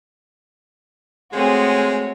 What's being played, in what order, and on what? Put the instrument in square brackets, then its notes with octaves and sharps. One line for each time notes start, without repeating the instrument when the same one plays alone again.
[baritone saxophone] G#3 [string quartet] A3 C4 G#4 [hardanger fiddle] F#4 C#5